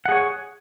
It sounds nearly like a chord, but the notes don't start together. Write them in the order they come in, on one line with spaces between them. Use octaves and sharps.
F#5 G#4 C#5